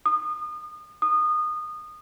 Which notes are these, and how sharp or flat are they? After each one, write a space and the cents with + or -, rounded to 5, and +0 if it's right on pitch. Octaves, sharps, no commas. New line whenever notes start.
D#6 -35
D#6 -25